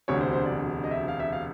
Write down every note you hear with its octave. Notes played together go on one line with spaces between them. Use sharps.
E1 D2 C3 C#5
C5
C5
D5
D#5
E5
F5
E5
F5